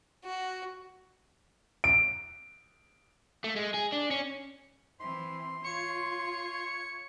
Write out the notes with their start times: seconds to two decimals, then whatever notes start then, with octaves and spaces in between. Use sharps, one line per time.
0.24 F#4
1.84 D7
3.44 A3
3.56 G#3
3.74 G#4
3.92 D4
4.11 C#4
5.00 E3 C4 C6
5.64 F4 C#5 C#7